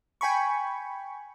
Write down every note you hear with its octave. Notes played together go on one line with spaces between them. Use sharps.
G5 G#5 B5 C#6